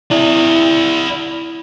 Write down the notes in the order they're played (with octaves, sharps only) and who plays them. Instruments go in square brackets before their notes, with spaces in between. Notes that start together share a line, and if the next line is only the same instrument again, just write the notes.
[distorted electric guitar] E4 D5